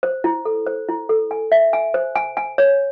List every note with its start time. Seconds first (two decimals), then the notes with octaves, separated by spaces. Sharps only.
0.03 C5
0.24 E4
0.45 A4
0.67 C5
0.89 E4
1.09 A4
1.31 G#5
1.52 E5
1.73 G#5
1.94 C5
2.15 G#5
2.37 G#5
2.58 C#5